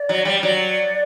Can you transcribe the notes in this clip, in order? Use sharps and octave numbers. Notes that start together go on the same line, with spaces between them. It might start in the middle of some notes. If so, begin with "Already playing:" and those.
Already playing: D5
F#3
G3
F#3 D5